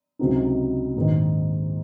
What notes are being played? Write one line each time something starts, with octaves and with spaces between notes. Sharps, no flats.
C#2 C3 F#3 C4 D#4
A#1 G#2 D#3